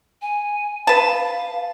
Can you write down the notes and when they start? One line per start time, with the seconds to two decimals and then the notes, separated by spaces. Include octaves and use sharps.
0.22 G#5
0.87 B4 F5 A5